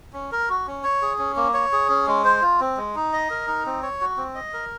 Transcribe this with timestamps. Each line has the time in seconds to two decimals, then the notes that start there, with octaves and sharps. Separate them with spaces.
0.13 C#4
0.32 A#4
0.50 F#4
0.67 C#4
0.83 C#5
1.02 G#4
1.19 C#4
1.36 A#3
1.54 C#5
1.72 G#4
1.89 C#4
2.07 G#3
2.25 C5
2.42 F4
2.60 C4
2.77 G#3
2.95 D#4
3.13 D#5
3.30 A#4
3.47 D#4
3.66 C4
3.82 C#5
4.01 F#4
4.17 C4
4.35 D#5
4.53 A#4